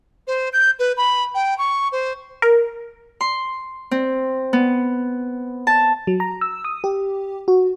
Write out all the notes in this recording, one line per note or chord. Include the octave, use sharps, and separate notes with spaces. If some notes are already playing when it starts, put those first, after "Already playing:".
C5
G6
B4
B5
G5
C#6
C5
A#4
C6
C4
B3
A5
F#3
A#5
E6
D#6
G4
F#4